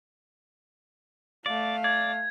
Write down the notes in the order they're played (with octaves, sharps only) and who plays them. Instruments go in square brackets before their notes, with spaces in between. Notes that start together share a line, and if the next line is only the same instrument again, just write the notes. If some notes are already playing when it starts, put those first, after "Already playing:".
[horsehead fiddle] A3 F5 [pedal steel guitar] D5
[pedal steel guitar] D5 [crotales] G#6